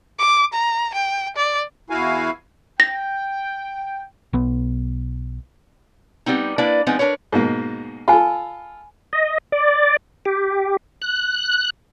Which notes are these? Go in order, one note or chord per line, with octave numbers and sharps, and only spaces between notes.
D6
A#5
G5
D5
E2 E4 F#4 F5 G#5
G5 A#6
B1 B3
G3 B3 C4 D#4
A#3 D4 E4 B4 D5
F3 G#3 B3 C4 D#4
D4 A#4 B4 C#5
G#2 B2 A#3
F4 A4 G#5 B5
D#5
D5
G4
F#6